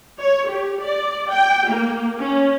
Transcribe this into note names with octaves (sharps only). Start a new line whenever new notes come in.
C#5
G4
D5
G5
A#3
C#4